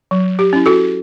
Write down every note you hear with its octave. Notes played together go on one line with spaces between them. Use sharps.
F#3
G4
C#4 E4
F#4 A4